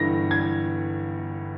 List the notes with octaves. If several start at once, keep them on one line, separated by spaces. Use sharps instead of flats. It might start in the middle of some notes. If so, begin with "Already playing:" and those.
Already playing: G1 G2 E3 A#6
G#6